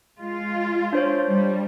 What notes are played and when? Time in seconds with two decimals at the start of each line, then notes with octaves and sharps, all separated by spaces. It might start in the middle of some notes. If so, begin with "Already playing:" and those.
0.19 G#3 F4
0.93 D4 C5 C#5
1.28 G3